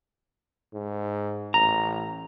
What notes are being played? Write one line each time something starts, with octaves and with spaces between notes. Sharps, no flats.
G#2
A1 A#5